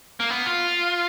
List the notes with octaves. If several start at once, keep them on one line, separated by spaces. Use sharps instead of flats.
A#3
B3
F4